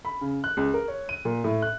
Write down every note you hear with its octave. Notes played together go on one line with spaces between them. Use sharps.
B5
C#3
F#6
C#2
A#4
C#5
D#7
A#2
A2
F#6